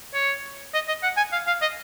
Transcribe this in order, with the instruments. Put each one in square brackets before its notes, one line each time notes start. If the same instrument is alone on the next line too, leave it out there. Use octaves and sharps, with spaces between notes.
[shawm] C#5
D#5
D#5
F#5
G#5
F5
F5
D#5